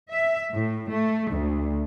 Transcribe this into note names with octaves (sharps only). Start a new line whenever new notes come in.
E5
A2
A3
D2